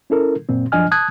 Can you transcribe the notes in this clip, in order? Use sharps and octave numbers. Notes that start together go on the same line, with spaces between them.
C#4 E4 A4 A#4
F#2 A#2 C4
F#2 F3 D4 D#5 G#5 F6
A5 D#6 F#6 G#6